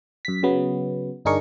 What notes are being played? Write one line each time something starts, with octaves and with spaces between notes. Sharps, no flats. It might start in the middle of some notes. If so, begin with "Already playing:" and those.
F#2 B6
C#3 F#3 B3
G1 D4 D#4 G#4 A#4 C#6